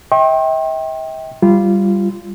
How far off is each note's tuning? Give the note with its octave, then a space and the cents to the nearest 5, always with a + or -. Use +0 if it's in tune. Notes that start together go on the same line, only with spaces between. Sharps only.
E5 -45 G5 +0 C6 +45
G3 +0 F4 -20